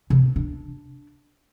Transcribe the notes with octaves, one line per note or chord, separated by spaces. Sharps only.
C3
D4